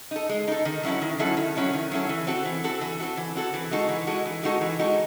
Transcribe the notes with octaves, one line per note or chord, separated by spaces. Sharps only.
D#4 A4
G#3
D#4 A4
D#3
F#3 C#4 E4 A4
D#3
F#3 C#4 E4 A4
D#3
F#3 C#4 E4 A4
D#3
F#3 C#4 E4 A4
E3
C4 F#4 A4
E3
C4 F#4 A4
E3
C4 F#4 A4
E3
C4 F#4 A4
E3
G#3 D#4 F#4 A4
E3
G#3 D#4 F#4 A4
E3
G#3 D#4 F#4 A4
E3
G#3 D#4 F#4 A4